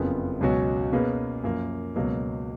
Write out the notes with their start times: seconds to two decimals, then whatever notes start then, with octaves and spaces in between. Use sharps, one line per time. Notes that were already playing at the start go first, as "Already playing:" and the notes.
Already playing: F#1 F2 C#3 F3 B3
0.41 C#2 B2 F#3 C#4 F#4
0.92 B2 A#3 C#4 G#4 B4
1.44 F#2 F3 A#3
1.96 C#2 B2 F#3 A#3